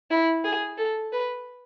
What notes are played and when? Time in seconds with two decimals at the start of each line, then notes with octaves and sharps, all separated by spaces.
0.11 E4
0.44 G#4
0.78 A4
1.12 B4